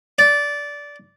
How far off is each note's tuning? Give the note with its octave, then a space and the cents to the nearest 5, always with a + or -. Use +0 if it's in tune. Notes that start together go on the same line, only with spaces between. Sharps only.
D5 -15